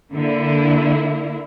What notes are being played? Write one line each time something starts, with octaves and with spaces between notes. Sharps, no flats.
D3 A#3 E4